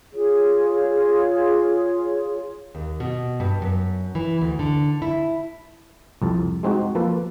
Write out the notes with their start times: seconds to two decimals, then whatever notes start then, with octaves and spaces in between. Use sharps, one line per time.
0.14 F4 G#4 C#5
2.75 D#2
3.00 B2
3.40 G2
3.62 F#2
4.15 E3
4.41 D2
4.59 D3
5.02 E4
6.22 C2 F2 A5
6.63 G#3 C4 D#4 F#4
6.95 F3 A#3 A4 B4